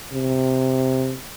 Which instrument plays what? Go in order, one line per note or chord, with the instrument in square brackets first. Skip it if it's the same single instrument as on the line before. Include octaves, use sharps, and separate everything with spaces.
[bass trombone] C3